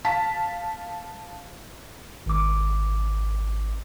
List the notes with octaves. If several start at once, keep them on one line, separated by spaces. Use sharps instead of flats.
F5 A5 B6
G#1 D6